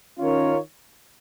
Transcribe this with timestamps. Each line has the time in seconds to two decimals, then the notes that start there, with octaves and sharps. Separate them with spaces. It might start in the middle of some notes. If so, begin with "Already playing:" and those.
0.19 D#3 C#4 F4 A#4 C#5